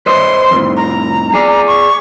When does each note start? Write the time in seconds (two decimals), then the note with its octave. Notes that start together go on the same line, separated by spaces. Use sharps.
0.06 B4 C5 D#5 C6
0.51 F2 A2
0.77 A#5
1.34 G#4 D5
1.67 C#6